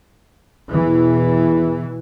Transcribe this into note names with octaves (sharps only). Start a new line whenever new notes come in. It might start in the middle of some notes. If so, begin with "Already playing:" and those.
E2 B2 E3